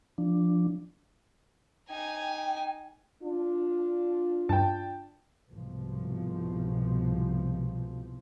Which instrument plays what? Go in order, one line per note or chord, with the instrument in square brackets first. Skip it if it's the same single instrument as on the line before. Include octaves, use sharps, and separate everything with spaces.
[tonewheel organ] F3 D4
[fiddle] D#4 G#5 [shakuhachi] G5
[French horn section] D4 F4
[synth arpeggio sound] G2 [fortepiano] G5 A5
[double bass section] C2 G#2 B2 F3